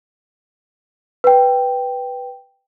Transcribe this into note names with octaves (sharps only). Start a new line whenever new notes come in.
B4 G5